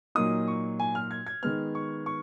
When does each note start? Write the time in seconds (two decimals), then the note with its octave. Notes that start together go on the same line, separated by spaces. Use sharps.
0.15 A#2 F#3 A#3 D#4 D#6
0.48 C#6
0.80 G#5
0.95 F6
1.11 G#6
1.27 G#6
1.42 D#3 G#3 B3 F6
1.75 C#6
2.06 C#6